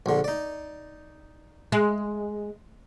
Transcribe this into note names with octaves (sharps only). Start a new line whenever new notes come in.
A#1 D3
D#4 D5
G#3